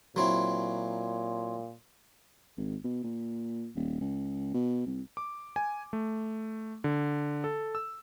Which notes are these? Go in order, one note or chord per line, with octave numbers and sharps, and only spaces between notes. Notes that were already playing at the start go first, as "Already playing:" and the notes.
A#2 F#3 C4 E4
G#1
B2
A#2
D#1
C#2
B2
C2
D6
G#5
A3
D3
A4
E6